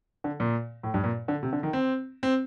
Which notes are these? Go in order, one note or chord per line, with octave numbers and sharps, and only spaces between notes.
D3
A#2
A2
G2
A#2
D3
C3
D3
D#3
C4
C4